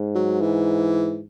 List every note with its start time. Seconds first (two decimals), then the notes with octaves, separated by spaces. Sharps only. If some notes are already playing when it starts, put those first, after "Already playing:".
Already playing: G#2
0.15 F#3
0.41 E3